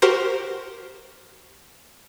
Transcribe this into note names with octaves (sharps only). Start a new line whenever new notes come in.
F#4 G4 A#4 C5